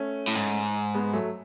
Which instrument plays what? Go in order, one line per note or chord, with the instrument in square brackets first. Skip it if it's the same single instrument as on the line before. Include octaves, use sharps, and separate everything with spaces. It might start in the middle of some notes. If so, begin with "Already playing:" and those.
Already playing: [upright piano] A3 C#4
[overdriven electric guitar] A2
G#2
[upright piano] G#3 B3
F#3 A3